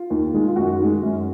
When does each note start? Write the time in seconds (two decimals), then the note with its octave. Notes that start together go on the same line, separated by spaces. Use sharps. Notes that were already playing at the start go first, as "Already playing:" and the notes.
Already playing: F4
0.10 D#2
0.34 D#3 G#3
0.48 F4
0.56 F#2 F#4
0.79 D#3 G#3
1.02 F#2